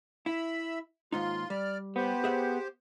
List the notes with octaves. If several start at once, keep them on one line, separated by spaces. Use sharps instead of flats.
E4 E5 B5 E6
D#2 G#2 D#4 F4 C6
G3 D5 F6
B3 G4 C5
G#4 E5 F#5